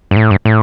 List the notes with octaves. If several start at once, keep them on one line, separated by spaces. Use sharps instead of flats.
G2
A2
G2
A2